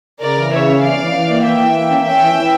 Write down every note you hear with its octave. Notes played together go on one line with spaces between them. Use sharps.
C#3 A#4 D5
E3
C#3 C#5 E5
C#4
E3 D5 F5
E3
E3
A#3
E3 E5 G5
E3
A#3
C#4
C#4 E5 G5
E3
E3